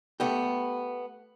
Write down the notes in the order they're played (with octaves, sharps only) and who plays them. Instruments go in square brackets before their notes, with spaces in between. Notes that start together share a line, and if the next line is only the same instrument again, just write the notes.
[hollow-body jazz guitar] A3 B3 G4